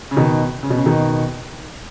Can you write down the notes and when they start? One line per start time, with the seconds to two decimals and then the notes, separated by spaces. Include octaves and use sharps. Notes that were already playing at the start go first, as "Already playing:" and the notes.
0.11 C#3
0.17 B2 D#3
0.63 C#3
0.70 B2
0.77 C#3
0.86 B2 D#3